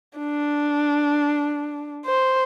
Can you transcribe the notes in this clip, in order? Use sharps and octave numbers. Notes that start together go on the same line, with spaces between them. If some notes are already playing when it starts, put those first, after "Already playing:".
D4
C5